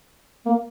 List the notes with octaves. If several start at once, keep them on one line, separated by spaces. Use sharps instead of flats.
A#3